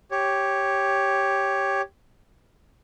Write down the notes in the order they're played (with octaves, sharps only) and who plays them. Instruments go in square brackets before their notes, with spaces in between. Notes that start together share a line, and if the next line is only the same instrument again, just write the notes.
[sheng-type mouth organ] G4 C#5